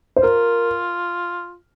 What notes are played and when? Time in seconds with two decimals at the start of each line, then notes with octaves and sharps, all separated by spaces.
0.16 C5
0.23 F4 A#4